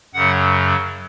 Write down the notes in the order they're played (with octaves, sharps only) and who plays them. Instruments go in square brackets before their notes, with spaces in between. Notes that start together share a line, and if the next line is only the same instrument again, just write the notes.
[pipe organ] F#2 C#3 F#3 F#5